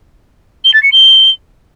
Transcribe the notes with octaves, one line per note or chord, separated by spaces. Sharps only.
G7
A6
C#7
G7